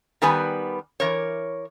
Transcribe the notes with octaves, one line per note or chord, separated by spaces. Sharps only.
D#3 G3 B3 B4 G#5
E3 A#4 C#5